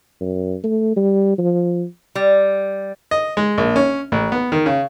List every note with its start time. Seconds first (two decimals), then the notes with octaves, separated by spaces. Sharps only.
0.21 F#2
0.64 A3
0.97 G3
1.38 F3
2.15 G3
3.11 D#5
3.37 G#3
3.58 A#1
3.76 C#4
4.12 A1
4.32 B3
4.52 D#3
4.66 C#3